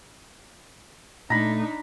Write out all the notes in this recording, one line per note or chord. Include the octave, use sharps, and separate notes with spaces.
A#2 A3 D4 D#4 A#5 B5